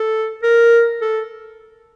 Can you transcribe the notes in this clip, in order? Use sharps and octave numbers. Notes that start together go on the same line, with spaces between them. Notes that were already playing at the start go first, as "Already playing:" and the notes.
Already playing: A4
A#4
A4